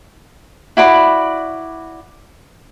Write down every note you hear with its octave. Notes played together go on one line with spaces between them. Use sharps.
E4 F#4 D5 B5